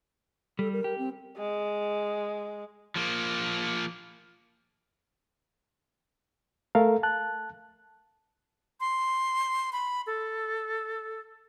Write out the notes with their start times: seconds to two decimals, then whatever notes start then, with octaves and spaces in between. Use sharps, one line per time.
0.59 G3 A4
0.73 A#4
0.84 G4
0.98 C4
1.38 G#3
2.96 F3 A#3
6.75 A3 A4 A#4 F5
7.03 A5 F#6
8.80 C6
9.73 B5
10.07 A4